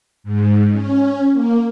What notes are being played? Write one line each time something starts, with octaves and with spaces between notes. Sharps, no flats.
G#2
C#4
A#3